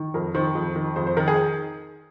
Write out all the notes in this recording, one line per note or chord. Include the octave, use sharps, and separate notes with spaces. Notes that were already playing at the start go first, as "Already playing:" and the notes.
Already playing: D#3
F2 A#4
D#3 C5
F2
D#3
F2 C5
C5
D#3 A#4
G#4